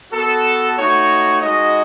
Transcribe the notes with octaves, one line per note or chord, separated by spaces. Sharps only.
B3 F#4 A4
A3 D#4 F#4 C#5
G#3 D#4 F#4 D#5